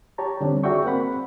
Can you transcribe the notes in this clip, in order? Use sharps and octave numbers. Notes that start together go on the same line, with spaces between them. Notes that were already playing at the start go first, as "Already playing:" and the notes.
G4 C#5 A5 A#5
D3 G3 C4 D4
F#4 G#4 D5 E5 G5 C#6
A#3 C4 F#5 B5